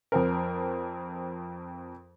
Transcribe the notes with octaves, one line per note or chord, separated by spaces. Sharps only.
F2 C4 A#4